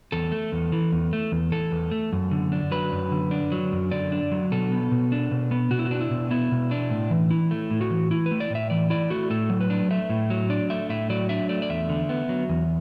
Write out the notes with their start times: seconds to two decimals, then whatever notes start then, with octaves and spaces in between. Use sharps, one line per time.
0.12 E2 A4
0.32 A3
0.52 E2
0.72 E3
0.92 E2
1.13 A3
1.32 E2
1.52 E3 A4
1.72 E2
1.91 A3
2.13 F#2
2.31 D3
2.52 D4
2.71 F#3 B4
2.92 F#2
3.12 D3
3.31 D4
3.52 F#3
3.72 F#2
3.91 D3 D5
4.12 D4
4.32 F#3
4.51 B2 A4
4.72 B3
4.91 B2
5.12 D4
5.31 B2
5.51 B3
5.71 B2 F#4
5.79 E4
5.85 F#4
5.91 D4
6.01 E4
6.11 B2
6.31 B3 E4
6.52 B2
6.71 D4
6.90 A2
7.10 E3
7.31 E4
7.51 A3
7.71 A2
7.81 F#4
7.91 E3
8.11 E4
8.26 B4
8.31 A3
8.40 D5
8.50 A2 E5
8.70 E3 D5
8.90 E4 D5
9.10 A3 F#4
9.30 A2 A4
9.50 F#3
9.61 B4
9.70 D4
9.91 A3 E5
10.09 A2
10.30 F#3
10.50 D4 D5
10.70 A3 E5
10.90 A2 E5
11.10 F#3 D5
11.29 D4 E5
11.49 A3 D5
11.62 D5
11.69 E2 E5
11.89 D3
12.09 B3
12.29 F#3
12.49 E2